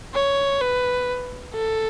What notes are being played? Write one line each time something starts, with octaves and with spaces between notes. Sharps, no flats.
C#5
B4
A4